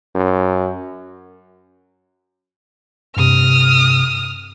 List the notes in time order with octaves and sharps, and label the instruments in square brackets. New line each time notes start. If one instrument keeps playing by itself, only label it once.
[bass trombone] F#2
[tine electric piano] G2 C3 [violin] D#6 F6